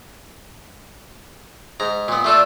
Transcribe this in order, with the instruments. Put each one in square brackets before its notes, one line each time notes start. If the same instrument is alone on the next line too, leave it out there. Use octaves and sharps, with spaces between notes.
[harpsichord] G#2 A#5
A#2 B3
[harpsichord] A3 F4 A4 [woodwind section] D5 E6